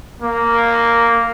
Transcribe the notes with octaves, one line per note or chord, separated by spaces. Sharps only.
A#3